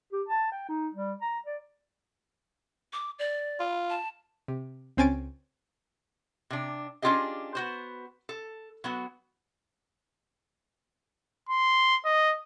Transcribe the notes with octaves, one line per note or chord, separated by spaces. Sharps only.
G4
A5
G5
D#4
G3
A#5
D5
D6
D5
F4
A5
C3
C#2 C4 C#4 G#5 A6 D7
C3 D4
C#4 D4 F4 G4 G#4 D#5
B3 F#4 C5
A4
F#3 B3 F#4
C6
D#5